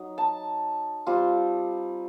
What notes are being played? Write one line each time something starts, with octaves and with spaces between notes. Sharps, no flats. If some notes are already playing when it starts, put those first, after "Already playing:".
Already playing: F#3 D#4
A5
G3 C4 F4